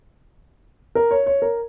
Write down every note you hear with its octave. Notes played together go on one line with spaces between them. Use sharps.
A#4
C#5
C#5
A#4